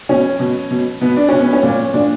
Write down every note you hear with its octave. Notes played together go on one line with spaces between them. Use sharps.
B2 C#4
B2
B2
B2 B3
D4
B2 C#4
B3
C#4
A#2
A#2 D4